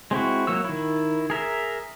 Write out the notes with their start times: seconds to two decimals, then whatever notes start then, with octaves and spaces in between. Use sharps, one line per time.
0.11 G#3 C4 E4 F#4
0.47 F#3 A#3 F#4 E6
0.65 D#3 E4
1.30 G#4 A#4 E5